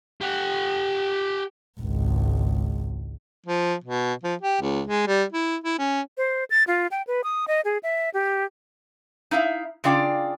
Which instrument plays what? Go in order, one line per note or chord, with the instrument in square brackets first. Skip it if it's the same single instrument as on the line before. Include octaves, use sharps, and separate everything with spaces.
[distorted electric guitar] G4 F#5
[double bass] G#1 C#2
[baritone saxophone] F3
B2
F3
G4
C#2
G#3
G3
E4
E4
C#4
[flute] C5
A6
F4
G5
B4
D#6
D#5
G#4
E5
G4
[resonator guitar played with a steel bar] D#4 E4 E5 F5
C#3 D4 F4 D5 G5